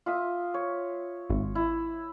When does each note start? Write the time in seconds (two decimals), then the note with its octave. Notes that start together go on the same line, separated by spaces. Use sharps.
0.06 F4 E5 D#6
0.54 C#5
1.30 G#1
1.55 E4